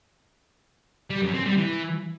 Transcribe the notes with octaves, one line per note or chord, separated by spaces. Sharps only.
G3
F#2
C4
G3
E3